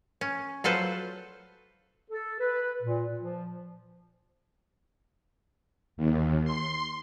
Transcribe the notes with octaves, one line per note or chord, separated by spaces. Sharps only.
C#4
F#3 F4 A4 B4 C5
A4
B4
A#2
F3
D#2
C6